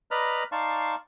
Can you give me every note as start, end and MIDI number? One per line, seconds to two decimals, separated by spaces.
0.11 0.44 71
0.11 0.44 74
0.11 0.44 75
0.11 0.44 82
0.11 0.44 83
0.11 0.44 89
0.52 0.95 63
0.52 0.95 74
0.52 0.95 77
0.52 0.95 81
0.52 0.95 84
0.52 0.95 85